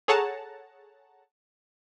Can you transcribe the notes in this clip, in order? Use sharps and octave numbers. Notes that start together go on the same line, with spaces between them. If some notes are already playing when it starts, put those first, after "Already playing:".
G#4 A4 C#5 F#5 A5 A#5